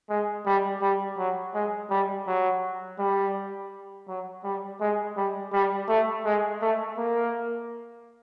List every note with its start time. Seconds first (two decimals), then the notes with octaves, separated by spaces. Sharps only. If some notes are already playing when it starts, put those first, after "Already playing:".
0.09 G#3
0.46 G3
0.82 G3
1.18 F#3
1.54 G#3
1.90 G3
2.27 F#3
2.99 G3
4.08 F#3
4.44 G3
4.80 G#3
5.17 G3
5.53 G3
5.88 A3
6.25 G#3
6.62 A3
6.97 A#3